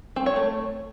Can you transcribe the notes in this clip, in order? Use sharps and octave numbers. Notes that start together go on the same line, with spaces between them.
C4
C#5
A3